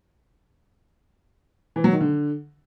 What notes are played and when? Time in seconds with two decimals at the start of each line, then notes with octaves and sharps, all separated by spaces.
1.76 E3
1.84 F#3
1.92 D#3
2.01 D3